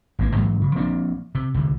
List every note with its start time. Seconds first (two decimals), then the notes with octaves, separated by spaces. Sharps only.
0.19 G#1 G#3 A#3
0.36 G#2 E3 F#3
0.61 C#3
0.75 F3 A#3 C4 D4
1.35 C3
1.54 C2 D3